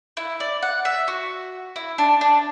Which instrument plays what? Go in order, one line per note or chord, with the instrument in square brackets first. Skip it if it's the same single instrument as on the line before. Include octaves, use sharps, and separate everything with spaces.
[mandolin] E4
D5
F#5
E5
F#4
E4
D4
D4